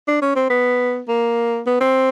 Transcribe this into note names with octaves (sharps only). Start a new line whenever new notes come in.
D4
C#4
C4
B3
A#3
B3
C4